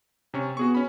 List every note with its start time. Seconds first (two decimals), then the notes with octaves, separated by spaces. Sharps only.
0.34 C3 C#4 C#6
0.57 B3 F#4 G#4 C#6
0.75 C#4 B5